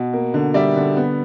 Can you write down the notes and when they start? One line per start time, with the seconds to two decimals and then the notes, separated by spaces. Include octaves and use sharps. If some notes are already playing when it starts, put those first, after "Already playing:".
Already playing: B2
0.13 A#3
0.34 D3
0.54 G3 D5 E5
0.76 D3
0.97 B3